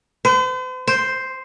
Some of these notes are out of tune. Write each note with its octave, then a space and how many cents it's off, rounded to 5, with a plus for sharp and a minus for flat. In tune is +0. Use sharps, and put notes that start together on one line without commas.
C5 -45
C5 +0